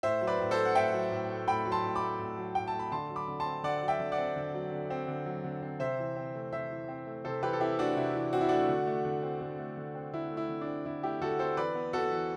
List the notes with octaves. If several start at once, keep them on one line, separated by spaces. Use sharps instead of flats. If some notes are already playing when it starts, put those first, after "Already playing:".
A2 C5 E5
F#3
B4 D5
A2
A4 C5
A3
F#5
A2 E5 G5
F#3
A2
A3
A2 G5 B5
F#3
A5 C6
A2
B5 D6
A3
A2
F#3
A2 G5
A5
A3
B5
D3 A5 C6
F#3
B5 D6
D3
A5 C6
C4
D3 D5 F#5
F#3
E5 G5
D3
D5 F#5
C4
D3
F#3
D3
C4
D3
F#3
D3
C4
C3 C5 E5
E3
C4
A3
C3 C5 E5
E3
C4
A3
C3 A4 C5
E3 G4 B4
A4
C4 E4 G4
A3 D4 F#4
C3 E4
E3
C4 F#4
E4
A3 D4 F#4
D3
A3
D3
C4
D3
A3
D3
C4
D3 E4
A3
E4
D3
D4
C4
D3 E4
A3 E4 G4
D3 F#4 A4
C4 A4 C5
E3 B4 D5
B3
B3 F#4 A4
E3